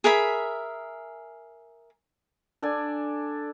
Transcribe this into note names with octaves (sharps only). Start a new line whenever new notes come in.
G#4 A#4 E5 B5
D4 A4 D5 G#5